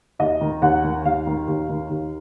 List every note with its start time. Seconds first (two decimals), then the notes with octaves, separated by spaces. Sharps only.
0.19 D#2 D#5
0.41 D#3
0.62 D#2 F#5
0.84 D#3
1.04 D#2 F5
1.27 D#3
1.47 D#2
1.69 D#3
1.89 D#2